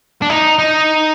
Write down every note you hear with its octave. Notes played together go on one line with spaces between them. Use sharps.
D4
D#4
D#4